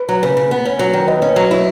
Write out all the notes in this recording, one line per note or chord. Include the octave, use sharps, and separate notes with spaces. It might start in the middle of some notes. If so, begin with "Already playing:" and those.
Already playing: B4
F#3
C#3 B4
C#3
B3
C#4
F#3
D#3
D#2 B4 D#5
C#4
F#3
E4